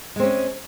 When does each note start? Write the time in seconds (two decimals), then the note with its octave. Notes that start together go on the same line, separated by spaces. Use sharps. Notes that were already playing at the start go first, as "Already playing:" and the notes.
0.16 G#3
0.20 C4
0.23 C#4